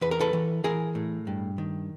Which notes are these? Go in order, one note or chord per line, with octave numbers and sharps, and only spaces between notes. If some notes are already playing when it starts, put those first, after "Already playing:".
E2 B4
A#4
A4 B4
E3
E3 G#4 A#4
A2
G2
D#3